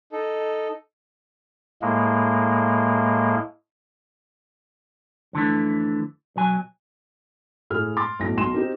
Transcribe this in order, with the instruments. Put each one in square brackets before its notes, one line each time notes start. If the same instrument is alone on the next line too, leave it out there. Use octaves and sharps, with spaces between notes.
[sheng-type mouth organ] D#4 A4
[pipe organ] A2 G#3 A#3
[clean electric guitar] F2 D3 E3 A3
B1 F#3 G#5
[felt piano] A2 G#4 F6
C6 D6 A6
B1 A2 A#6
B1 C6 E7
C4 D#4 G4